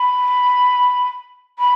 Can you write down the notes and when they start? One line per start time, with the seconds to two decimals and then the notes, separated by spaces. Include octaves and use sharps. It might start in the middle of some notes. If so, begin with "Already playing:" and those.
Already playing: B5
1.58 B5